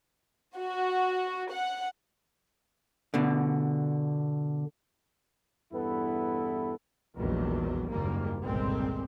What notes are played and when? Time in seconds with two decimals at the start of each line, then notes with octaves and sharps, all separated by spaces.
0.57 F#4
1.51 F#5
3.14 B2 D3
5.72 E2 G2 B3 E4 A4 B4
7.17 A#1 E2 G#2 D#3 F#3 G3
7.89 F#1 D#2 G#2 G3 A#3
8.43 G1 C2 A#2 G3 G#3 C4